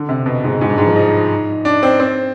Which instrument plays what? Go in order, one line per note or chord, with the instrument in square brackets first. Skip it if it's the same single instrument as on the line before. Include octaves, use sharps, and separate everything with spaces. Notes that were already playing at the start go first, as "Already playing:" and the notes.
Already playing: [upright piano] D3
C3
B2
G#2
G#2
G2
G#2
F3
D#4
D4
C4
C4